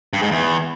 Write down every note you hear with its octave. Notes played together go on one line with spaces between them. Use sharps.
G2
G#2
E2